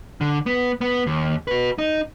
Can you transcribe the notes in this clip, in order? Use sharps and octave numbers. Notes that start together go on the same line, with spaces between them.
D3
B3
B3
D#2
F#4 B4
D#4